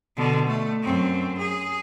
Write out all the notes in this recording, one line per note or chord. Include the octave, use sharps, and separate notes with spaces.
B2 D3
A3
F#2 C4
G#4